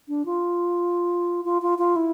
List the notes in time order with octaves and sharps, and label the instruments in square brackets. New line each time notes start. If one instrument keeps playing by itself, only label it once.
[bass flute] D4
F4
F4
F4
F4
E4